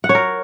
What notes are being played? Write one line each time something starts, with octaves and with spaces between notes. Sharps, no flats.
F#5
C#5
A#4